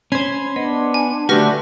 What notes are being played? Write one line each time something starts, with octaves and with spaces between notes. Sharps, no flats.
C#4 C5 B5 C6 G#6
B3 D4 D#5
G#5
D3 A3 F#4 G4 B4 F6 A#6